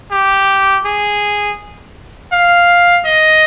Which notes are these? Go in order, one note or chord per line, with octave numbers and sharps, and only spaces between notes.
G4
G#4
F5
D#5